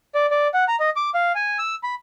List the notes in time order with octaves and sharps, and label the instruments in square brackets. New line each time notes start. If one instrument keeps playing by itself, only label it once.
[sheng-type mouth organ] D5
D5
F#5
A#5
D#5
D6
F5
G#5
E6
B5